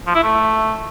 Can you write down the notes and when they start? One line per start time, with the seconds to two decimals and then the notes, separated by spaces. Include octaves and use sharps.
0.07 F3
0.15 E4
0.23 A3